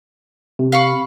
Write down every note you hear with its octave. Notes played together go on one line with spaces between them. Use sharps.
C3
F5 B5 C#6